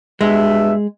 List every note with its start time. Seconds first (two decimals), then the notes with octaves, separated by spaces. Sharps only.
0.21 G2 B2 G#3 E5